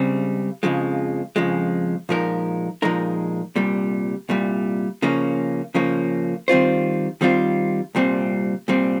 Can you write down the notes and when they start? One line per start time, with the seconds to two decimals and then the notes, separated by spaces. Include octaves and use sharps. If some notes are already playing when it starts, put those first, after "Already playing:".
Already playing: C#2 C#3 G3 C4
0.63 F2 C#3 F3 G#3
1.36 F2 C#3 F3 G#3
2.09 A#2 F3 G#3 D#4 A#4
2.82 A#2 F3 G#3 D#4 A#4
3.56 C2 A#2 G3
4.29 C2 A#2 G3
5.02 C#3 F3 A#3 C#4
5.74 C#3 F3 A#3 C#4
6.48 D#3 G3 C4 F4 C5
7.21 D#3 G3 C4 F4 C5
7.95 C2 A#2 G3 C4
8.68 C2 A#2 G3 C4